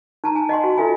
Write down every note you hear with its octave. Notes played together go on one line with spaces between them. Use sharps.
D#4 A5 A#5
G#5 A5
D#5 F#5 G#5 C6
F#4
E4 F4 A4 E5 G#5 B5